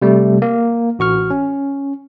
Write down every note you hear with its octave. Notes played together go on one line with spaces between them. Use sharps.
C3 G3 A3
A#3
A1 F#4 C#6 F6
C#4